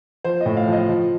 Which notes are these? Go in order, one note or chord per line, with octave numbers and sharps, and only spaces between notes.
F3 C5
D#5
A2
F5
F3 D#5
F3